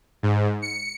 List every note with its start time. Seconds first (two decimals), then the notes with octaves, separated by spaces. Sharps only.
0.23 G#2
0.62 C#7